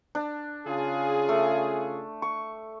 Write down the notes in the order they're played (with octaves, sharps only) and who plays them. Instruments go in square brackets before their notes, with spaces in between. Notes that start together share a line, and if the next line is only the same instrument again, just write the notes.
[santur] D4
[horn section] C#3 F4 G#4
[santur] A3
C#6